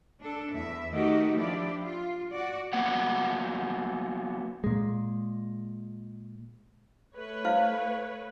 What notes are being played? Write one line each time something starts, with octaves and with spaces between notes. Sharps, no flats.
D4 A4
E2 E5
D#3 A3 D#4 F#4 G4
F3 D4 E4 G4 D5
F4
F#4 D5
F#3 A#3 B3 F#5
A#2 G#3
A3 B4 C#5
E4 C5 F5